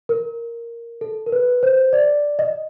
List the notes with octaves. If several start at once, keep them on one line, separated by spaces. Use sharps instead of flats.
A#4
A4
A#4
B4
C5
D5
D#5